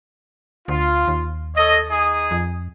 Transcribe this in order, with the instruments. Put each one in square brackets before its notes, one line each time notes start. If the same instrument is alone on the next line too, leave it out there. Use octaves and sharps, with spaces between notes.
[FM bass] D2 [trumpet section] F4
[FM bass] D#2
[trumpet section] A4 C#5 D#5
D#4 G#4 D#6
[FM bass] F2